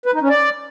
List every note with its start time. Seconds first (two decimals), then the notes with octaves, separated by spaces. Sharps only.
0.06 B4
0.14 D#4
0.22 C#4
0.30 D5